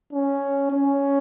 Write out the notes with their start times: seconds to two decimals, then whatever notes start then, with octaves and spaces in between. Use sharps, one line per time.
0.13 C#4
0.72 C#4